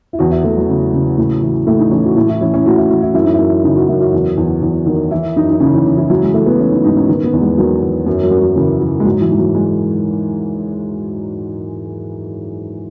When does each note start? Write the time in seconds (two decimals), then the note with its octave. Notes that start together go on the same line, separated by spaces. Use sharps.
0.13 E4
0.19 E2 F#4
0.31 E4
0.44 E2 A3
0.57 F#3
0.68 C#3
0.93 C#3
1.18 A2
1.43 E3
1.67 A2 A3
1.79 D#4
1.91 E3 C#4
2.05 F#4
2.16 A2 E4
2.29 E4
2.41 E3 C#4
2.54 C#4
2.65 A2 F#4
2.78 E4
2.90 E3 F#4
3.02 E4
3.14 F#2 E4
3.24 D#4
3.34 E4
3.39 F#2
3.64 C#3 D#4
3.76 F#4
3.88 F#2 E4
4.00 F#4
4.13 E2
4.37 E2
4.62 E2
4.86 D#3
5.11 E3 E4
5.36 F#2 D#4
5.50 D#4
5.60 C#3 C#4
5.74 E3
5.86 C#3
5.98 E3
6.10 E3 F#3
6.22 G#3
6.34 E3 A3
6.46 B3
6.59 E3 C#4
6.72 D#4
6.84 G#2 D#4
6.96 C#4
7.08 D#3 B3
7.24 B3
7.33 E2
7.41 G#3
7.58 D#3 F#3
7.83 E2
8.06 F#2
8.23 F#3
8.31 F#2
8.40 F#3
8.56 C#3 E3
8.81 E3
9.00 G#3
9.05 G#2 F#3
9.21 E3
9.30 G#2
9.38 F#3
9.55 G#3